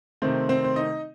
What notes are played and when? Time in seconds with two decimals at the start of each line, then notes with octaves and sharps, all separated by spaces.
0.22 C3 D#3 A3 C4 C5
0.49 C4 C5
0.64 C5
0.76 D#4 D#5